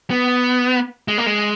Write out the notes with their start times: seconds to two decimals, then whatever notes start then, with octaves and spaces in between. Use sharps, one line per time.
0.11 B3
1.08 G#3
1.18 A#3
1.26 G#3